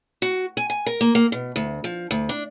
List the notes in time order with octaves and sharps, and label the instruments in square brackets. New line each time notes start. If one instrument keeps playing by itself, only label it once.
[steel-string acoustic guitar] F#4
G#5
G#5
A#4
A#3
A#3
B2
D2
F3
D2
D4